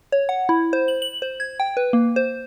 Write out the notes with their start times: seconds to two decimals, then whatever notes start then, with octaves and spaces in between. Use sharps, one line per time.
0.12 C#5
0.29 F#5
0.49 E4
0.73 C5
0.88 F#7
1.02 F#7
1.22 C5
1.40 G#6
1.60 G5
1.77 B4
1.93 A#3
2.16 C5